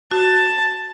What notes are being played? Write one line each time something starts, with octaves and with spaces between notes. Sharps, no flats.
F#4 A5